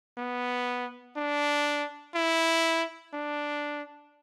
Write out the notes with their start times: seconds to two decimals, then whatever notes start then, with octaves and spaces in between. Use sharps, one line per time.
0.18 B3
1.17 D4
2.15 E4
3.14 D4